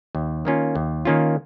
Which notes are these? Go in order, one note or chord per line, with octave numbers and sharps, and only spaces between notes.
D#2
D#3 A#3 C#4 F4
D#2
D#3 A#3 C#4 F4